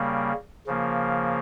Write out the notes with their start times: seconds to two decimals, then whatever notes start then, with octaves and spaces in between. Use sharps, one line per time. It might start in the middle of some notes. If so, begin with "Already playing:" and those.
Already playing: C#3 G3 A#3
0.67 C#3 F3 A#3